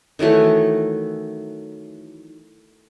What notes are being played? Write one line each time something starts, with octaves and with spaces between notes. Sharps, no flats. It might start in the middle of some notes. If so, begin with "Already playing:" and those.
D#3 E3 F#3 A3